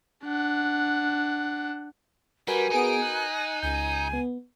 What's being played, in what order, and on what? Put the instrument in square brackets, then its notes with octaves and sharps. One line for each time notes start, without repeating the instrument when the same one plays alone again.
[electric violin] D4 F#5
[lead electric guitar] G3 [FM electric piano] F#4 A#4 B4 [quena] G#5
[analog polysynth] B3 G#4 D7 [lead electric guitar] D#4
[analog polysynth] F#6
[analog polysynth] C#2 [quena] G#5 [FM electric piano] G6
[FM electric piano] B3